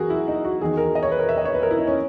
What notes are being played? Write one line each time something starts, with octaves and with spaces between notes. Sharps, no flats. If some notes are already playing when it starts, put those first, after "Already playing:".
Already playing: F#2 E3 F#4 G#4 A#4
E4
D#4
F#4
E2 D#3 G#4
A#4
D#5
C#5
B4
A#4
E5
D#5
C#5
B4
A#4
E4
D#4
C#4